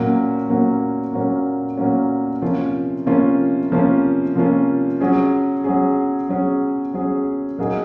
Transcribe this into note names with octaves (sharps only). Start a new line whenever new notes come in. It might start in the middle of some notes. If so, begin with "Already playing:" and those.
Already playing: A#2 F#3 A#3 C#4
A#2 F#3 A#3 C#4
A#2 F#3 A#3 C#4
A#2 F#3 A#3 C#4
C3 F3 A#3 C#4 F4
C3 F3 A#3 C#4 F4
C3 F3 A#3 C#4 F4
C3 F3 A#3 C#4 F4
F#3 C#4 G#4
F#3 C#4 G#4
F#3 C#4 G#4
F#3 C#4 G#4
A#2 F#3 A#3 D#4 G#4